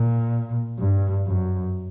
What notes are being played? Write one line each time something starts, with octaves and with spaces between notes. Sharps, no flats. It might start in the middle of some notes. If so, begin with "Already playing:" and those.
Already playing: A#2
G2
F#2